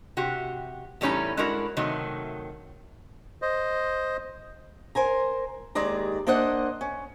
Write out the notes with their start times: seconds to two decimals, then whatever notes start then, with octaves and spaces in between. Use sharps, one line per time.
0.17 C3 F#4 G4
1.01 E2 A2 G3 C#4 D#4 A#5
1.37 G#3 D4 E4 F#4 A#4
1.77 C3 D#3 F#3 A3
3.42 C5 D#5
4.95 A#4 C5 G#5 A#5
5.75 D#2 D#3 G#3 D5 A#5
6.27 A#3 D4 C5 D#5 F#5
6.81 C#4